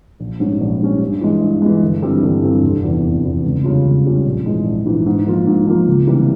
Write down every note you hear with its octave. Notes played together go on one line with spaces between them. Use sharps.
A#1
G#2 G3 C#4
A#1
G#2 G3 C#4
G2
E3 G#3
G2
E3 G#3
G1
G2 E3 G3 C4
G1
G2 E3 G3 C4
F1
E2 E3
F1
E2 E3
C#2
C#3 G3 C#4 F4
C#2
C#3 G3 C#4 F4
A#1
G#2 E3 G#3
A#1
G#2 E3 G#3
G#2
F3 A#3 F4
G#2
F3 A#3 F4
C#2
C3 E3 G3 A#3